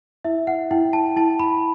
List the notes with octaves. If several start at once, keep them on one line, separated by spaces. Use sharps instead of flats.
E4 E5
F#5
E4 G5
A5
E4 A5
B5